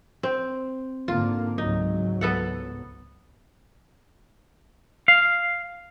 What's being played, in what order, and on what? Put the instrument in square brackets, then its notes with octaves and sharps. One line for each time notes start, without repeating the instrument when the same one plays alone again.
[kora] C4
[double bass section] G#2 D3 A#3 [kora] F4
[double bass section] C#2 G#2 F#3 [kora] D#4
[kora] B3 A4 F#5
[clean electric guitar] F5